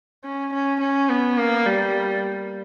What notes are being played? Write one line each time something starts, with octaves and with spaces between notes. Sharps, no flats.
C#4
C#4
C#4
B3
A#3
G3